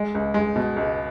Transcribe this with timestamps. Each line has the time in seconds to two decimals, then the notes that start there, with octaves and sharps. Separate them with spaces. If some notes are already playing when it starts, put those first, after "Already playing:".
Already playing: G#3
0.15 C#2
0.34 G#3
0.56 B2
0.76 C#2